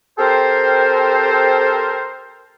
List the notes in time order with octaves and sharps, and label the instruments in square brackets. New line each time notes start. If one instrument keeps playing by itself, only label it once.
[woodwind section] C4 G4 A4 A#4 C5